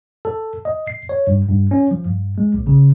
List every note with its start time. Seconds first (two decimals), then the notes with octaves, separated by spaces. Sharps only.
0.25 A4
0.65 D#5
0.87 C7
1.09 C#5
1.27 G2
1.49 G2
1.71 C#4
1.91 F3
2.05 G2
2.38 G#3
2.54 A#1
2.67 C#3